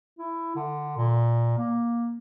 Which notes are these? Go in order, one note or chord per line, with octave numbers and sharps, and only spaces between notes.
E4
D3
A#2
A#3